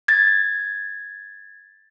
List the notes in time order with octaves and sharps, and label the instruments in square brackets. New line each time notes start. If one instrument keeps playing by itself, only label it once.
[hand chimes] G#6 A6